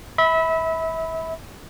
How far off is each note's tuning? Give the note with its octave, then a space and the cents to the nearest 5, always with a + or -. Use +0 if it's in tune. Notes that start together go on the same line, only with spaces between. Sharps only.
E5 -30 B5 +5